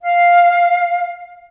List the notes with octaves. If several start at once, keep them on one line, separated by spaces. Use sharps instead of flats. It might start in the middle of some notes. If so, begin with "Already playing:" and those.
F5